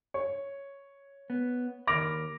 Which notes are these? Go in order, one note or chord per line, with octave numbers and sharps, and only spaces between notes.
C#5
B3
D#2 A#4 B5 D6 A#6 F7